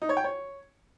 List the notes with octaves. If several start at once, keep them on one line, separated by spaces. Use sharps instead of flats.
D#4
C#5
G5
C#5